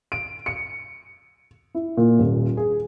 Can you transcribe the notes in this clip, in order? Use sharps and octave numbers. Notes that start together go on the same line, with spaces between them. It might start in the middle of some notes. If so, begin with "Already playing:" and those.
D7
C#7
E4
A#2
D#1
G#4